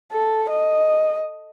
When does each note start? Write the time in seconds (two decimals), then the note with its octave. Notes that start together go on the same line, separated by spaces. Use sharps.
0.12 A4
0.50 D#5